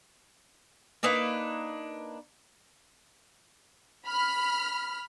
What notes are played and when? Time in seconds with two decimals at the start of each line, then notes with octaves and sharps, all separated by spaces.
1.03 A#3 D4 D#4 B4
4.06 B5 F6